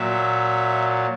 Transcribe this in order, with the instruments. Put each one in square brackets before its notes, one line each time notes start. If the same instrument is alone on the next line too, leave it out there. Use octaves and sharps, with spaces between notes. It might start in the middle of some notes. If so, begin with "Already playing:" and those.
Already playing: [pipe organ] A#2 F#3 E5